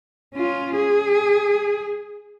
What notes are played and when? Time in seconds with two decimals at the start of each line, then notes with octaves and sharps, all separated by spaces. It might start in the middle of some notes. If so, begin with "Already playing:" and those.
0.35 C#4 F4
0.76 G#4